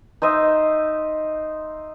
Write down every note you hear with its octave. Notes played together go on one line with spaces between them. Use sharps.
D#4 C5 D#5 E5